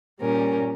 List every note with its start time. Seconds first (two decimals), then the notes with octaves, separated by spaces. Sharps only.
0.20 A#2 G3 C#4 A#4